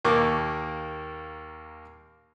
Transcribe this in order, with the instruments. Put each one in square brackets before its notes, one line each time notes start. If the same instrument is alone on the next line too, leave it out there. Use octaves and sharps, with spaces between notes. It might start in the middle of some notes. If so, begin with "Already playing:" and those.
[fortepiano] D#2 A#3 C#6 D6